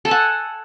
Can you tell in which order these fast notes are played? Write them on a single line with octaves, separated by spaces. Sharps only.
A4 G#5 F#5